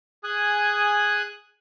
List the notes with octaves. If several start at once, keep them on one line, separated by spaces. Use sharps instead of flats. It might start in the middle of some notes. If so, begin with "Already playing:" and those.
G#4 G#5 D#6 F#6